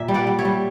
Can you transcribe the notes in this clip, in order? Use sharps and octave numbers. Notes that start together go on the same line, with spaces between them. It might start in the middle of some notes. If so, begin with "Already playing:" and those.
Already playing: A#2 E5
G3
D5 F#5
G3
C#5 E5
G3